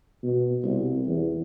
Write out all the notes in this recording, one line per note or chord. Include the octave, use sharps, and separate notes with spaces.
B2
C2
E2